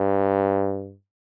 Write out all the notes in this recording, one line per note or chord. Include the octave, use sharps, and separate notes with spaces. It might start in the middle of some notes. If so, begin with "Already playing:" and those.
Already playing: G2